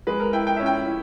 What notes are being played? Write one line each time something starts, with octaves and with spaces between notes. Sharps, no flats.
G#3 B4
A#4
E4 G5
G5
C#4 E5
G5
E4